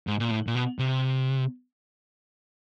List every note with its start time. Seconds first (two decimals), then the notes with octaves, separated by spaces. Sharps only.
0.07 G#2
0.20 A#2
0.31 A2
0.47 A#2
0.55 B2
0.79 C3